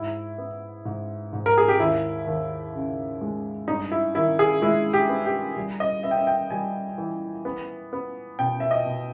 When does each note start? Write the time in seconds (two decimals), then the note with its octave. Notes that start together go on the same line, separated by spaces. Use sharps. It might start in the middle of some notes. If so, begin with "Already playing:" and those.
Already playing: G#2 E4
0.38 B3
0.85 G#2
1.33 G#2
1.46 A#4
1.58 G#4
1.68 G4
1.80 D#2 E4
2.27 D#2
2.75 C#3
3.21 G#3
3.68 G2 D#4
3.92 E4
4.15 D#3 E4
4.39 G#4
4.62 G#3 E4
4.93 G4
5.09 B3
5.26 G4
5.57 G3
5.80 D#5
6.03 B3 E5
6.11 G5
6.17 E5
6.27 G5
6.50 G3 G#5
6.98 E3
7.45 B3
7.93 B3
8.39 B2 G5
8.60 E5
8.71 D#5
8.86 B2